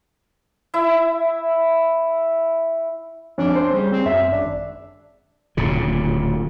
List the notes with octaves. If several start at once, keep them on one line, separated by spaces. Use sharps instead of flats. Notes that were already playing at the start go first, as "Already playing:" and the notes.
E4 E5
F2 C#4 D4
C5
C#3 G3
C4
F#2 E5
G#1 D4
D1 A#2 C#3